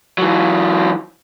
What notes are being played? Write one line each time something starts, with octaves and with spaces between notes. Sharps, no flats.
E3 F#3